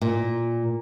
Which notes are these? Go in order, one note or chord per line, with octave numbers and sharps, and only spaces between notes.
A#2